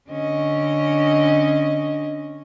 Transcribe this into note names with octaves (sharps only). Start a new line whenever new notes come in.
D3 C#4 D#5